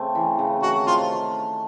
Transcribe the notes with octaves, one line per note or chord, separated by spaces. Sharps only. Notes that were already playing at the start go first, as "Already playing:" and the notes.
Already playing: C#3 A3 C4
E3
C#3
D#3 F#4
C3 F4